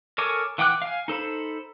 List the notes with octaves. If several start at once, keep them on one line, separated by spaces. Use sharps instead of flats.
A4 A#4 C#5 G#5 D6
E3 F#5 G5 D6 F#6
F5 G#5
D#4 A4 C5 B5